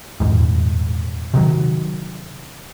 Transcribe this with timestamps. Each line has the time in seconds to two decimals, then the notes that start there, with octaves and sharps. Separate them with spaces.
0.20 D#1 E2 G#2
1.34 C3 D#3 F#3